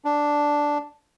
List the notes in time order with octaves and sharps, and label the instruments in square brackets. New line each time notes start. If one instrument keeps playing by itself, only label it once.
[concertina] D4